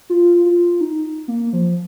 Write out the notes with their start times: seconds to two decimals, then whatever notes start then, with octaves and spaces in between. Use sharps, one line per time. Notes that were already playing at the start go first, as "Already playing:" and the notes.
0.10 F4
0.46 F4
0.81 D#4
1.28 A#3
1.53 F3